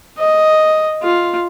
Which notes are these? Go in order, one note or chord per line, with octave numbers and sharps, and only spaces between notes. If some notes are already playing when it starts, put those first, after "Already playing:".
D#5
F4